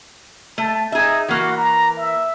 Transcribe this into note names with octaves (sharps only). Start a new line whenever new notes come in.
A3 A5
D#4 G#4 E5
E3 A#3 F#4
A#5
E5